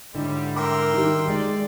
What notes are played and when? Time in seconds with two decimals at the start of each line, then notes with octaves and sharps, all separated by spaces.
0.14 G#2 D3 F#3 G3 E4
0.56 A#4 E5 G5 C6 D6
0.94 D#3 G3
1.28 G#3 A3 D5